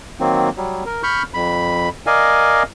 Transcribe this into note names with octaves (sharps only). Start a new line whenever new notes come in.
D#3 F#3 A#3 C4
F#3 G3
A#4
B5 C#6 F6 G6
F2 B5
A#4 D5 D#5 F5 G#5